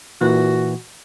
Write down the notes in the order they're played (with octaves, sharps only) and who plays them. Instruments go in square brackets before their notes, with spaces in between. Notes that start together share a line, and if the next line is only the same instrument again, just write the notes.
[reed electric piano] A#2 E3 [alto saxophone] F#4